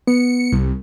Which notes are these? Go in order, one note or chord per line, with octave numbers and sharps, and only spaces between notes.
B3 C#7
C2